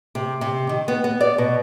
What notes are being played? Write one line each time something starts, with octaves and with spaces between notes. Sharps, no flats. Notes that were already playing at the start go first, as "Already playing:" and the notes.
C3
C3
D#3
B3
B3
D5
B2